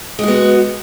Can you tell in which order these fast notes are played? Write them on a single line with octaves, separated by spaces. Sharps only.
G#3 F#4 B3